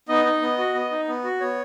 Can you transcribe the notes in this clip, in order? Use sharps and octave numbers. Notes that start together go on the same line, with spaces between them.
B3 D#4 D#5
D#4
B3
F#4
B3
D#4
B3
F#4
B3 C#5